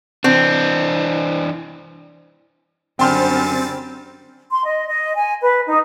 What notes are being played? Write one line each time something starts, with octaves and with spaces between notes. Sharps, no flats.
E3 C4 D4
F#2 D3 G3 C4 G5 C6 F6 A6
C6
D#5
D#5
G#5
B4
D#4